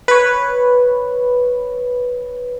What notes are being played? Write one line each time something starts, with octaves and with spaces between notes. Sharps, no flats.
B4 C#5